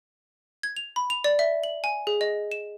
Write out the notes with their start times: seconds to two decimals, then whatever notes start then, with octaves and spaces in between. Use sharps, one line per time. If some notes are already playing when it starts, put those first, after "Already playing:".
0.63 G#6
0.77 F7
0.96 B5
1.10 F7
1.24 D5
1.39 E5
1.63 F#7
1.84 G#5
2.07 G#4
2.21 D#5
2.52 E7